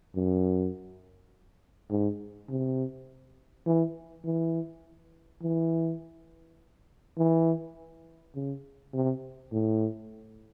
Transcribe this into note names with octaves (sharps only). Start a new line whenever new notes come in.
F#2
G#2
C3
E3
E3
E3
E3
C#3
C3
A2